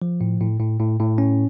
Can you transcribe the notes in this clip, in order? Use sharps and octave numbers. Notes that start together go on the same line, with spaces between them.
F3
A2
A2
A2
A2
A2
C#4